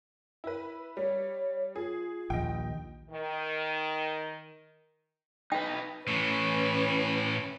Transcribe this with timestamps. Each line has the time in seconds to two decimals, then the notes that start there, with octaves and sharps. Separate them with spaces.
0.44 E4 B4
0.97 G3 C#5
1.76 F4 G#4
2.30 A#1 D#2 D#5 G5
3.10 D#3
5.52 D#4 B4 G5
6.08 A2 E3 C#4 B4